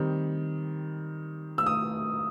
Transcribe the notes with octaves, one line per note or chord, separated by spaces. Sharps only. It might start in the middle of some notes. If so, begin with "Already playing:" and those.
Already playing: D#3 G3 C4
E6
D#6